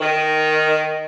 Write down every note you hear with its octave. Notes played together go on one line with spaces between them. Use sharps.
D#3